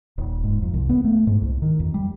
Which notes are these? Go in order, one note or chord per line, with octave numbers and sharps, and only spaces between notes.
D#1
G#2
F2
C2
B3
A3
G#2
C2
D#3
F2
G3